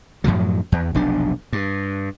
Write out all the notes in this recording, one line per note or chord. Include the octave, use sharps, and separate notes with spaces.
F#2 A2 F3 F#3
E2
F1 B1 D4
G2